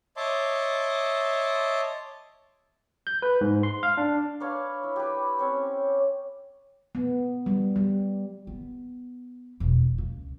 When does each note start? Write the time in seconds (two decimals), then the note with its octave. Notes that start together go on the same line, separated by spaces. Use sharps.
0.17 C#5 D#5 E5 A5 C6 D6
3.07 G6
3.22 B4
3.41 G#2
3.63 C6
3.83 F5
3.98 D4
4.40 D4 B4 C#5 F5
4.83 E4
4.96 G4 B4
5.39 C4 C#4 C#5
6.95 B3
7.46 G3
7.76 G3
8.47 B3
9.60 E1
9.98 C#2